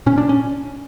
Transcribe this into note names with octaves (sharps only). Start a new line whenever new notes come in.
A#2 C#4
D4
C#4